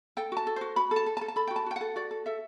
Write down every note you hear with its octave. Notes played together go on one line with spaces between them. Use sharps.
A4 G5
F#4 A5
A4
F#4 C5
F#4 B5
A4
A5
A4
A5
A4
A5
A4 B5
F#4 G5
A5
F#4 G5
A4 F#5
F#4 D5
A4
A4 E5